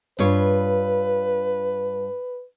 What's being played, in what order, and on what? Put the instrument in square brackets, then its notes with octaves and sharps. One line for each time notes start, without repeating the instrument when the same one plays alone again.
[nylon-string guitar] G2 F4 C#5 [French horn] B4